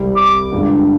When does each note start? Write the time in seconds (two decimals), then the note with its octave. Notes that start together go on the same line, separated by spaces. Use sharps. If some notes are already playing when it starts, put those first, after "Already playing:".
Already playing: C2 C3 G3 C4
0.17 D6
0.52 G1 G2 D3 G#3